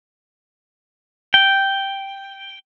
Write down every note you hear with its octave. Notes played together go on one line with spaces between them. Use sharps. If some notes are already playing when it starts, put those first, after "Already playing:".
G5